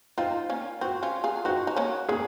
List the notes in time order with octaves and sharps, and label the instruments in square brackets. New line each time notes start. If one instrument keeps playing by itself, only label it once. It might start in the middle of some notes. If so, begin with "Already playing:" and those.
[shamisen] C4 D#4 [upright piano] F4
[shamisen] A#3 C#4
[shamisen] C4 [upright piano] F#4
[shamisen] C#4 F4
F4 G#4
[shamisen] C4 D#4 [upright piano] F#4
[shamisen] D#4
A#3 C#4
[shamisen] A#3 C#4 [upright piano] G#4